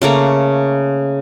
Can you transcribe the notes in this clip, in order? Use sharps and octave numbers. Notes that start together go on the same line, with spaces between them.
C#3 A3 A#3 A#5